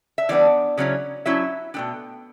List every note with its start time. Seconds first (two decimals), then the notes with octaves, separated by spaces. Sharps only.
0.18 E5
0.29 E3 G3 B3 D4 D5
0.77 C#3 F#3 C#4 E4
1.26 F#3 C#4 E4 E5
1.74 B2 A3 D4 G5